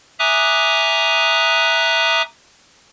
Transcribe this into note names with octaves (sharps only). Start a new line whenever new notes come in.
E5 G#5 A#5 D6 D#6 F#6